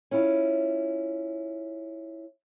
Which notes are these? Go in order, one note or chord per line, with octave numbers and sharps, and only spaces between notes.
C#4 E4 F4